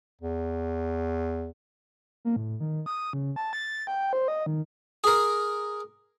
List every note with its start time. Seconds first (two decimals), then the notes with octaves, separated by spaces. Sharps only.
0.21 E2
2.25 A#3
2.36 A2
2.60 D#3
2.86 D#6
3.13 C#3
3.36 A5
3.53 A6
3.87 G5
4.13 C5
4.28 D#5
4.46 D#3
5.04 G#4 A#4